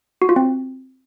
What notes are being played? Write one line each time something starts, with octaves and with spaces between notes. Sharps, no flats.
F#4
F4
C4